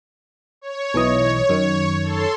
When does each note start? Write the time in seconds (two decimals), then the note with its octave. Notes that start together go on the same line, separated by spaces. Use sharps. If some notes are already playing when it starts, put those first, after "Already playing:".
0.61 C#5
0.94 B1 E3 D#5
1.49 F#2 D#3
2.03 A4 C6